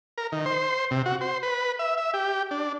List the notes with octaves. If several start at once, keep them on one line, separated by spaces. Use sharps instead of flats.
A#4
D#3
C5
C3
F#4
C5
B4
E5
E5
G4
D4